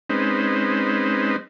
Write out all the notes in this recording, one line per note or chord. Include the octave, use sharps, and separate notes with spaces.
G#3 C4 C#4 D#4 B4 C5